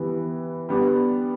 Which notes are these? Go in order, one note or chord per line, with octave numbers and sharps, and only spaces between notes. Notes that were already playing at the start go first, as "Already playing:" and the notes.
Already playing: E3 G3 B3
G3 B3 D4